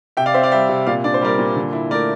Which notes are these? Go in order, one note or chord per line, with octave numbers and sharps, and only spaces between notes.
C3 E5 G5
D5 F5
C4 C5 E5
D5 F5
G3 E5 G5
C3
A#2 D5 F5
D4 D5
C5
G3 A#4 D5
A#2
D3
E4
A3 A#4 D5